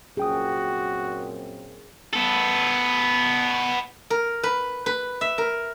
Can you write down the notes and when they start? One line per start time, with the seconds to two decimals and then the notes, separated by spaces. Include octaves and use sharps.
0.17 C2 F#2 A#2 C4 F#4 G#4 G5 D#6
2.14 B3 A4
4.10 A#4
4.43 B4
4.86 B4
5.21 E5
5.38 A#4